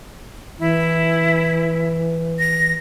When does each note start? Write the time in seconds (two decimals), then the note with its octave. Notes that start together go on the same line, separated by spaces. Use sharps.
0.59 E3 E4
2.39 A#6